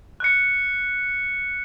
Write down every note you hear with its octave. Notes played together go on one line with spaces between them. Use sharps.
F#6 C#7